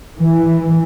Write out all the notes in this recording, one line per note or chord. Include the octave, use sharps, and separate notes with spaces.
E3